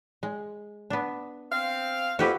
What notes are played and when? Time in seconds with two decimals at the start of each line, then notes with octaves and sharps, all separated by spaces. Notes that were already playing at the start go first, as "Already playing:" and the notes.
0.23 G#3
0.90 B3 D4
1.52 C4 F5
2.19 F2 F#4 G4 B4